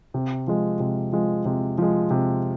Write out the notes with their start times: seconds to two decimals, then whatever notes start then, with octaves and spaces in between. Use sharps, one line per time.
0.14 C3
0.47 F3 G#3
0.80 C3
1.12 F3 G#3
1.46 C3
1.78 F3 G#3
2.11 C3